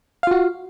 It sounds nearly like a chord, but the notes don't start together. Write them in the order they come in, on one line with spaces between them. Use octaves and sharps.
F5 F4 F#4